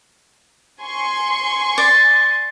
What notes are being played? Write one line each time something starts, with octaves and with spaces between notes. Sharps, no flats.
G#5 C6 C#6
D5